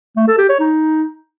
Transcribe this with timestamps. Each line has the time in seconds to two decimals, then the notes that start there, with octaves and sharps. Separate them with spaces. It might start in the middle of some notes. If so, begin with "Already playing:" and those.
0.17 A3
0.28 A4
0.38 G4
0.49 C#5
0.60 D#4